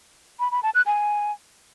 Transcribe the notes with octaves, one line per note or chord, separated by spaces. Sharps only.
B5
B5
A5
F#6
G#5